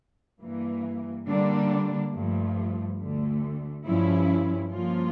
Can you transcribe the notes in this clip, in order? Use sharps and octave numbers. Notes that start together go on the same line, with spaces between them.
G2 E3 A#3
D3 G3 A#3 D4
G2 F3 A3
D2 D3 A3
G2 F3 C#4 E4
G2 F3 A#3 C#4 F4